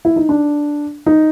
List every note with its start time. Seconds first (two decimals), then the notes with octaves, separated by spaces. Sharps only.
0.05 E4
0.16 D#4
0.29 D4
1.06 D#4